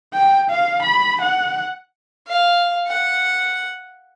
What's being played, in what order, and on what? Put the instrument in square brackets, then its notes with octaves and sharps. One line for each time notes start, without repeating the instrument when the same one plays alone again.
[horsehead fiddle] G5
F5
B5
F#5
[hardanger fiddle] F5
F#5